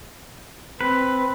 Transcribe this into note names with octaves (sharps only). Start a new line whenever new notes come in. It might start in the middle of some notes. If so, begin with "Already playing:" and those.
C4 B4